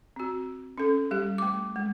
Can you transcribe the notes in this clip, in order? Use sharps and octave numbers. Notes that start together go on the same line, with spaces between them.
C4 F#4
C#4 A4
G3 G4
A3 D6
G#3